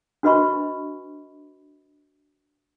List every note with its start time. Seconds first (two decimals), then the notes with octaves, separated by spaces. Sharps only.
0.23 D4 F#4 B4 D#5 B5 C#6